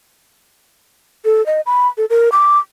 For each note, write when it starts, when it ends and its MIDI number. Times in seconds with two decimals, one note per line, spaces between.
1.25 1.45 69
1.46 1.61 75
1.66 1.87 83
1.98 2.05 69
2.10 2.29 70
2.32 2.58 86